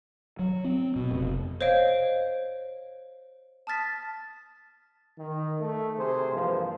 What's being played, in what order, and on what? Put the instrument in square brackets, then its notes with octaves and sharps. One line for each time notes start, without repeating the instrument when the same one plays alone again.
[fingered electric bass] F#3
C4
B2
F1
[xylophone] C5 C#5 D#5 F5 D7
A5 D#6 F6 A6 B6
[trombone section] D#3
A3
C3 G#4 C5
G2 E3 F3 A#3